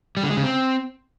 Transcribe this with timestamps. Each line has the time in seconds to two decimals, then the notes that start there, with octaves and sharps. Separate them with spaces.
0.17 G3
0.23 D3
0.30 G#3
0.37 C#3
0.44 C4